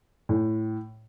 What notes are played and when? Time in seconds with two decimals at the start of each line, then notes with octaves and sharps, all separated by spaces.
0.29 A2